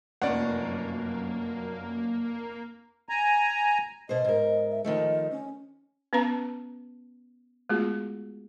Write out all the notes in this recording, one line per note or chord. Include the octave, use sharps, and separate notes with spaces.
F1 F#2 A#3 C#4 D5 F#5
G#5 A#5
B2 C5 D#5
G#2 A#4
E5
D#3 F3 A3 D#5
C#4
B3 C#4 B4 F5 A5 A#5
G#3 A3 B3 F4 F#4 G#4